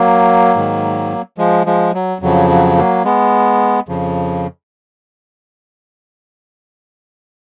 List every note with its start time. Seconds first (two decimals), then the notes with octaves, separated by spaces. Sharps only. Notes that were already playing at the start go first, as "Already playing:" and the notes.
Already playing: F#3 A#3
0.56 G#2 D#3
1.38 F3 G#3
1.66 F3 G#3
1.94 F#3
2.22 F2 C#3 F3 F#3
2.50 F#3
2.78 F#3 A#3
3.05 G#3 B3
3.89 F2 C#3 F3